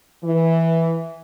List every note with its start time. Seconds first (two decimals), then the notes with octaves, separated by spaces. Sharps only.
0.24 E3